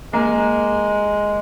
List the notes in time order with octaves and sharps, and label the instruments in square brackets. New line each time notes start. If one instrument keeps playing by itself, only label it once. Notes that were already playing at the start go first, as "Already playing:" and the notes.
[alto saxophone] G#3 [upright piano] A#3